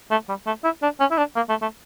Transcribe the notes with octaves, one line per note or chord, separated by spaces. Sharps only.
A3
G3
A3
E4
D4
C#4
E4
D4
A#3
A3
A3